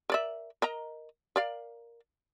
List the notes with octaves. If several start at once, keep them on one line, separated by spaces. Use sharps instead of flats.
A#4 D5 E5
A#4 D#5 A#5
A#4 D5 F5